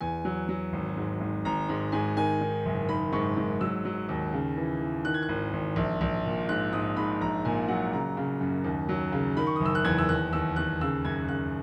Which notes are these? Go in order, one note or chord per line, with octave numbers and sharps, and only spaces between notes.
E2 G#5
F#3
F#3
G#1
G#2
G#1
G#1 A#5
G#2
G#2 G#5
D#3 G#5
D#3
F#1
D#3 B5
G#2 C#6
G#2
F#3 E6
F#3
D#2
C#3
E3
E3
D#3 F#6
G#6
F#6
G#1
G#1
A#1
A#1
A#2
G#2 F#6
G#2 D#6
G#2 B5
A#1 A#5
A#2 G#5
F#3 F#5
C#3 A#5
C#3
F#2
D#2
F#3
C#3
D#3 B5
C#6
D#6
F#1
E6
F#6
E2 G#6
E6
D#2 F#6
D#2 E6
D#2 F#6
C#3 E6
F#2 G#6
C#3 F#6